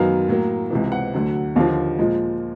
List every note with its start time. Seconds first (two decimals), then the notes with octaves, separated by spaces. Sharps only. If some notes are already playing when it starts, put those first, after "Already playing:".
Already playing: F#2 D#3 F#3 B3 F5
0.28 A2 F#3 A#3
0.70 C#2 C3 E3
0.92 F#5
1.14 D2 D3 F#3
1.56 D#2 D3 F3 F5
1.99 A#2 F3 G#3